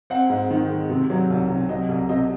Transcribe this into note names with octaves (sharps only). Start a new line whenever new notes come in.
C4 F#5
G#2
D#3
G#3
C3
F#3
C2
C3
F#3 D#5
C2
C3 D#5